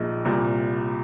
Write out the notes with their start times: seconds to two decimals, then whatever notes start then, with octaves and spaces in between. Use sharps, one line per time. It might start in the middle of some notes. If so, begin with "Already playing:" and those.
Already playing: A#1 A#2 G#3 D#4
0.25 C2 A#2 G3